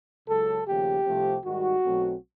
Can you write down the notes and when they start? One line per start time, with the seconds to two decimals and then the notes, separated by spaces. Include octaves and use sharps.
0.28 C#2 C#3 F#3 A4
0.67 D#2 C#3 F3 A3 G4
1.06 C2 C3 F3 A3 C4
1.45 G#2 D#3 G3 F#4
1.84 B1 B2 F#3 A3 C4